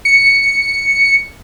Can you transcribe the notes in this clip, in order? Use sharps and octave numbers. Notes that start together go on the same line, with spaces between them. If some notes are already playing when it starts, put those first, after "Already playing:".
C#7